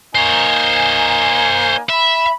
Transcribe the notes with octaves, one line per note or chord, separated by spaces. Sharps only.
A#3 D#4 C5 C#5 G#5
E5 B5